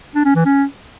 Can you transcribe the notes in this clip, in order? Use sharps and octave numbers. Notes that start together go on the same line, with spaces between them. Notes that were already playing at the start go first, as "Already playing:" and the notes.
D4
C#4
E3
C#4